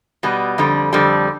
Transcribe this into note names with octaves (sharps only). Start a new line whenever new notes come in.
B2 G3 B3
F2 D3 G3
F2 D3 G3